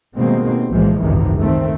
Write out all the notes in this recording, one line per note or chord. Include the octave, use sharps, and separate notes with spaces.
B2 D#3 G3 G#3 A#3 C4
B1 A2 E3 F3 G#3
G#1 C#2 F#2 C3 D#3 E3
D#3 A3 C4